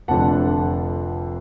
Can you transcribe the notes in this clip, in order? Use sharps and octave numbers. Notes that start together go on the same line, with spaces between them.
F1 F2 D3 F#5 A5